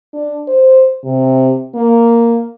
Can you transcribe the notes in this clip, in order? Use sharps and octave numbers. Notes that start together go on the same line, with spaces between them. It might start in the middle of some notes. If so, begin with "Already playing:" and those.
D4
C5
C3
A#3